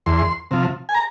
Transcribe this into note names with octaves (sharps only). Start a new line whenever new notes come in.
E2 C6
C3 F3
G#5
A#5